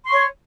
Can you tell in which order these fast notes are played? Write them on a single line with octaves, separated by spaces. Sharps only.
C6 C#6 C#5